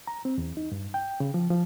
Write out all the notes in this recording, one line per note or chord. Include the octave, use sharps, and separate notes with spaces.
A#5
C4
E2
D#4
G2
G5
C#3
F3
F3